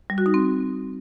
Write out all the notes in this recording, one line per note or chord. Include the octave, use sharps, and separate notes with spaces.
G3
F#4
D#4
C4